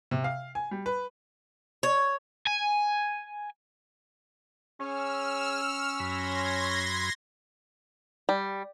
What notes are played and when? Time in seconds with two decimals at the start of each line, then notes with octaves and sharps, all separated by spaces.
0.11 C3
0.24 F5
0.55 G#5
0.71 G3
0.86 B4
1.83 C#5
2.47 G#5
4.80 C#4 G#4 E6 F6
6.00 F#2 B5 C6 G#6 A#6
8.29 G3